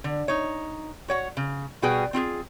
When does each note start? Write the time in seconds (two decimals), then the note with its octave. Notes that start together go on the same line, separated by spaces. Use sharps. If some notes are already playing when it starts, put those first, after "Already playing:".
0.04 D3
0.28 D#4 C#5
1.08 F#4 C#5 F#5
1.37 C#3
1.82 B2 G3 F#4 G#4 B4 G5
2.13 C4 F4 F#4 G#4